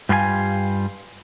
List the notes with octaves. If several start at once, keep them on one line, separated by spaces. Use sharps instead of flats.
G2 G3 F4 G4 G#5